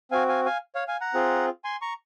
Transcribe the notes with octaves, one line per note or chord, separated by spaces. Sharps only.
C4 F#4 F5 G#5
F5 G#5
F5 G#5
C#5 F5
F5 G#5
F#5 A#5
C4 F4 G#4
G#5 C6
A#5 C#6